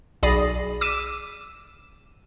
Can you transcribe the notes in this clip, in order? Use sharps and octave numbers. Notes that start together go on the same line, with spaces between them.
B1 G#4 D5 B5 A#6 C7
D6 E6 B6 D#7 E7